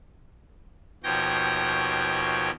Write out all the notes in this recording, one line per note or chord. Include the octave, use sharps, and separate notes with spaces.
D#2 B2 F3 C#5 G5 A#6